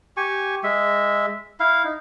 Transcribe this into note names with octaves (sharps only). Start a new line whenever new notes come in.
G4 G#5 C#6
G#3 E5
E4 F5
D#4